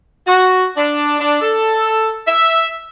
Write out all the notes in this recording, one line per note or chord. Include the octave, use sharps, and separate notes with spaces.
F#4
D4
D4
A4
E5